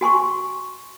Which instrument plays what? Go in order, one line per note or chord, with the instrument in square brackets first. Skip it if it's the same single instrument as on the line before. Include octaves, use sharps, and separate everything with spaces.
[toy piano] F#4 G#5 C6 C#6